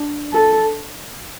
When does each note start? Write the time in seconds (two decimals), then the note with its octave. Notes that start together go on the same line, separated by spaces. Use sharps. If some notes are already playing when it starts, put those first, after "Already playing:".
Already playing: D4
0.33 A4